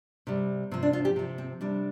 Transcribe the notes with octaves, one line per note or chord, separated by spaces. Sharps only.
C3 G3
C3 F3 C4
D4
F4
G4
C3 F3
C4
C3 G3 D4